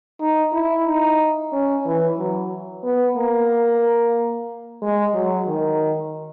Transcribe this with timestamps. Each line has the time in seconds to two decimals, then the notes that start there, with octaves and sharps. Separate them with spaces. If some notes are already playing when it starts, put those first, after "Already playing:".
0.20 D#4
0.53 E4
0.86 D#4
1.52 C#4
1.85 E3
2.18 F#3
2.84 B3
3.16 A#3
4.82 G#3
5.14 F#3
5.47 D#3